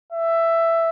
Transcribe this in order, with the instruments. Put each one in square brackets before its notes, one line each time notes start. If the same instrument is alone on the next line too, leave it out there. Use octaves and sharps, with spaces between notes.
[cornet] E5